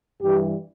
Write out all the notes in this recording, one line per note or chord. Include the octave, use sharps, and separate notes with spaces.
G2 E3 G3 G4